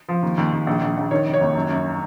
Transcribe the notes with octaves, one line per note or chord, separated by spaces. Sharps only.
F3
D#2
D#2
D#2
A#1
A#1
A#1
D#3 C#5
F1
C#5
D#2
F#2
F#2